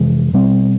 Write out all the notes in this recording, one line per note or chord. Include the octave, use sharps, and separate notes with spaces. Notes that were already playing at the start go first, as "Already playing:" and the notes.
Already playing: F2 C3 E3 G#3
B2 G3 C4